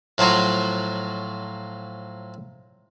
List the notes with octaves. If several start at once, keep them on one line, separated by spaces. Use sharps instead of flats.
A2 F3 F#3 F4 F#4